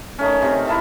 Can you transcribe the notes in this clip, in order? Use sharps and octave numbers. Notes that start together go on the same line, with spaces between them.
D#3 A3 C#4
C3
E4 A#4 E5 A5